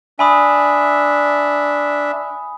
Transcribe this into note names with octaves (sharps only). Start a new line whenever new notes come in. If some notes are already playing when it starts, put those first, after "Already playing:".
D4 E5 G#5 B5 D#6